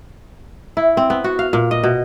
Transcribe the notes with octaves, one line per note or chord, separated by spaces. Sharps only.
E4
C4
B3
F#4
F5
A#2
D#5
B2